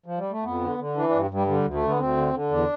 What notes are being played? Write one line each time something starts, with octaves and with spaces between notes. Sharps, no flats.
F3
G3
A3
F2 B3
D3
D3
E3 D4
G2 D4
G2 G3
D3 G3
D2
A3
D3
B3
D2 C4
D3
D3
E2 D4